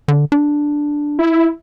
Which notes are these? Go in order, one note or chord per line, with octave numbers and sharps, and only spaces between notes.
D3
D4
E4